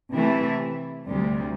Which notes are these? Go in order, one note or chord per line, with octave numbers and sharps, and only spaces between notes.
C3 E3 A3 E4
D2 C3 G3